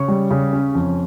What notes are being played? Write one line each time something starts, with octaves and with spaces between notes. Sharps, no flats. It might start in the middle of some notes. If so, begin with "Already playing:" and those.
Already playing: C#3 C#5 C#6
G3
C#3
C#4
F2